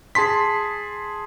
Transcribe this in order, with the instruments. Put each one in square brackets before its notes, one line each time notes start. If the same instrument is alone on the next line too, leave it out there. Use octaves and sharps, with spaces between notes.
[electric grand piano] G#4 A5 C6 B6